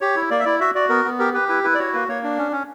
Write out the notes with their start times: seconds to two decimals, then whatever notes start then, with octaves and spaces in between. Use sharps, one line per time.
0.01 G4 C#5
0.16 E4
0.30 A#3 D5
0.39 E5
0.45 E4 D5
0.60 F#4 E5
0.75 F#4 D5
0.89 B3 A#4
1.05 B3
1.19 G4 A#4
1.34 G4 B4
1.48 E4 B4
1.64 E4 B4
1.74 D5
1.79 F#4 C#5
1.93 A#3 B4
2.09 A#3 C#5
2.23 D4
2.38 C#4
2.52 C#4